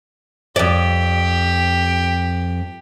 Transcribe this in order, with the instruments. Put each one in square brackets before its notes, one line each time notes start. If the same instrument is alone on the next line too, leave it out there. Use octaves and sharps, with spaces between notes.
[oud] F2 D5 [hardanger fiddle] G4